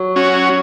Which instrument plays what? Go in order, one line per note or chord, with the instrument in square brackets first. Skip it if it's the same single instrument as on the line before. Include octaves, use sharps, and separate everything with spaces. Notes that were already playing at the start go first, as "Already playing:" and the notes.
Already playing: [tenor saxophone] F#3
[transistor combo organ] C#4 F#4